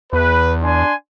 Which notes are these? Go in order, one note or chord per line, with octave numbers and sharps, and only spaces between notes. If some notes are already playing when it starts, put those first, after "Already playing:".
E2 B4
D4 G#5 C6